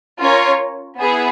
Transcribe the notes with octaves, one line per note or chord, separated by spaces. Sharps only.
C#4 F4 A#4 C#5
B3 E4 G#4